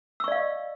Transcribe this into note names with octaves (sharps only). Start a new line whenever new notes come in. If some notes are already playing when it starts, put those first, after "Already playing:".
D5 D#5 F5 C#6 E6